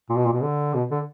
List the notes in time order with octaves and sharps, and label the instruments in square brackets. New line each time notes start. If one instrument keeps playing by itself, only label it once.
[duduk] A#2
B2
A#2
B2
D3
B2
D3